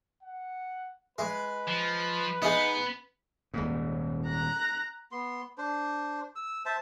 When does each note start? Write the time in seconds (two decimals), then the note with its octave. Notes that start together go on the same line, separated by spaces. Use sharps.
0.23 F#5
1.18 G#3 B4
1.68 F3
2.42 G#3 B3 D#4
3.54 D#1 G#2
4.26 A#5 F#6
5.12 B3 C6
5.58 D4 C5
6.36 E6
6.66 C5 E5 A5